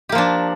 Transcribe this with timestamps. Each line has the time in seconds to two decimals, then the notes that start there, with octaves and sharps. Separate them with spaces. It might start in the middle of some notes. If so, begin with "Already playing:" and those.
0.09 G4
0.12 A#3
0.15 F3
0.18 D4